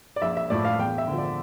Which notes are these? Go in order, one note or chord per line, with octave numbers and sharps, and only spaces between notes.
D5
A#1 E5
E5
A2 F3 A3 D5
F5
E2 G5
E5
D3 F3
D5